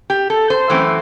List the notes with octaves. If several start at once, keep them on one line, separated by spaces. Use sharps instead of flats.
G4
A4
C5
F#2 E3 A3 C4